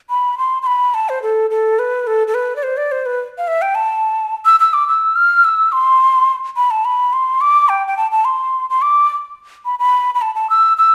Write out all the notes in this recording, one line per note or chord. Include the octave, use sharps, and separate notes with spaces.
B5
C6
C6
B5
A5
C5
A4
A4
B4
A4
A4
B4
D5
C5
D5
C5
B4
F5
E5
G5
A5
E6
E6
D6
E6
F6
E6
C6
B5
A5
B5
C6
D6
G5
G5
A5
A5
C6
C6
D6
B5
B5
B5
A5
A5
E6
E6